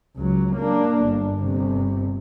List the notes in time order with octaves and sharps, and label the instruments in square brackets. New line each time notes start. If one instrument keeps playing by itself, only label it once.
[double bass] C#2 F#3
A#3 D4
G1
G1 C3